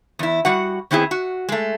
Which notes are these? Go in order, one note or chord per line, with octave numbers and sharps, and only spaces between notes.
E2 E4
G3 F#4 F#5
D#3 B3 C4 E4 G#4
F#4
G#3 A3